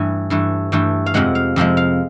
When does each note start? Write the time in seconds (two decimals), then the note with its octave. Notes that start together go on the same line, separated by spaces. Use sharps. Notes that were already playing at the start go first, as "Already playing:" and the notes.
Already playing: G2 E3 A3 G#5
0.30 G2 E3 A3
0.72 G2 E3 A3 G5
1.06 F5
1.14 F2 C3 F3 G#3 F#5
1.35 F5
1.56 F2 C3 F3 G#3
1.77 F5